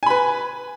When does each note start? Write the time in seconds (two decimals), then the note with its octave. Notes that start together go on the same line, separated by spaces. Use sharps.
0.03 G#5
0.06 B5
0.10 B4